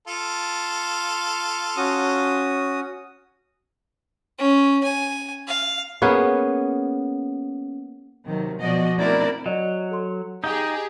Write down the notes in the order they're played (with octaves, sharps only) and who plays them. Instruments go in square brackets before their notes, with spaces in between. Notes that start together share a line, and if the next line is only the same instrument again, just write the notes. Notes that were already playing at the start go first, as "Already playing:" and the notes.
[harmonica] F4 A4
[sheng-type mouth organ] C#4 F#4 D#6
[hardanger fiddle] C#4
G#5
F5
[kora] A#3 B3 C#4 G#4
[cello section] C3 D#3 F#3
B2 F3 F#4 D5 D#5
A3 C4 D4 E4 A#4 D5
[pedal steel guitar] F#3 [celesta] D5 D#5
[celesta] A4 C6
[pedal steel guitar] D#4 [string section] G4 G#4 [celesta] F5